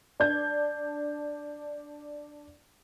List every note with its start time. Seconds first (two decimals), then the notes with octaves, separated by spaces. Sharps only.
0.20 D4 G6 G#6